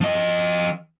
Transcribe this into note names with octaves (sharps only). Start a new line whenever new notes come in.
F3 D#5